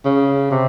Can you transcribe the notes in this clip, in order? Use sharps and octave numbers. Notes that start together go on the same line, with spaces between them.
C#3
C3